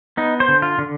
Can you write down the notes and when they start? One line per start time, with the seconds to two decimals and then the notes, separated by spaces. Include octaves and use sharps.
0.17 B3 D#4
0.40 C5
0.48 D3
0.62 F4
0.78 D3